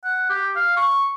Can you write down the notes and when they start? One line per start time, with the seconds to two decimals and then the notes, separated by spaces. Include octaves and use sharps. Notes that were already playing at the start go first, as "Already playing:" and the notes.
0.04 F#5
0.29 G4
0.56 F5
0.76 C#6